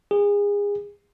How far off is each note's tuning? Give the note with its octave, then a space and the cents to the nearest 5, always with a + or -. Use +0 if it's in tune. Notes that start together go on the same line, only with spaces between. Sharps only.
G#4 -30